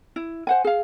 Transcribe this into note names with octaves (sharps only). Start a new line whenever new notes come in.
E4
C5 F#5 G#5
G#4 F5